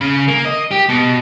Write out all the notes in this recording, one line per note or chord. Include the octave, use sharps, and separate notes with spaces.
C#3
A#3
D#5
G4
B2